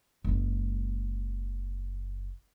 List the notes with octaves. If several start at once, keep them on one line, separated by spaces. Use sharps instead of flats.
F#1 G#3